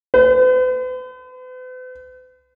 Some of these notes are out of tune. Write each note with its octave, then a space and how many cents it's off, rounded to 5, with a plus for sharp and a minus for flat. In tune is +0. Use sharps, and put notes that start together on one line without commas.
B4 +45